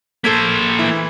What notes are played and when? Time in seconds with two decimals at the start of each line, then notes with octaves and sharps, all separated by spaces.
0.24 A#3 A4 C5 G#6 B6
0.79 E3 E4